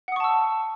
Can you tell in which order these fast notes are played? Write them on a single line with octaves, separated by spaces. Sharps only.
F#5 D#6 C#6 A5 E6